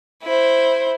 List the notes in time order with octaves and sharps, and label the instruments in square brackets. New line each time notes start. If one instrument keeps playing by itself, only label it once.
[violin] E4 C5